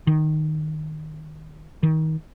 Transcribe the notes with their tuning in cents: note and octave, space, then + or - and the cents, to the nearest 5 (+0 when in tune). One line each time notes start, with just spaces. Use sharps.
D#3 -10
D#3 +25